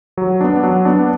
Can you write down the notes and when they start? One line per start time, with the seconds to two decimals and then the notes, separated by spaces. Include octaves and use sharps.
0.17 F#3
0.41 B3 D4
0.63 F#3
0.85 B3 D4